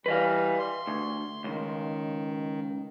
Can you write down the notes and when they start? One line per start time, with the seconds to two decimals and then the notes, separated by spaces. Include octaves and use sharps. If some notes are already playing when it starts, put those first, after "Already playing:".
0.06 E3 G3 B4 D#5 F5
0.59 C6
0.87 D2
1.44 C#2 D#3